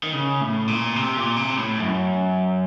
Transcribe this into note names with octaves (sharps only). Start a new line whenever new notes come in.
D#3
C#3
A2
A#2
C3
A#2
C3
A2
F#2